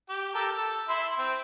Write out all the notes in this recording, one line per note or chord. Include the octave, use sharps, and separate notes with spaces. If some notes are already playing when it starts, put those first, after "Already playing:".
G4
G4 A4 A#4
A4
E4 E5 C6
C4